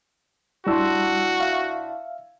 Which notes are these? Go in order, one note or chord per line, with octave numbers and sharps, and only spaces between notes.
A2 G3 D4 F#4 C6 E6
E5 F5